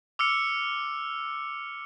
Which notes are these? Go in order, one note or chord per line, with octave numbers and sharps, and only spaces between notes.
D6 E6 F6 C#7